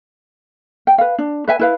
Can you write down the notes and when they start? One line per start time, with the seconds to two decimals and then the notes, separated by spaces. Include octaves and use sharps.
0.87 G5
0.98 B4 F5
1.18 D4
1.48 B4 E5 G#5
1.59 E4 B4 F5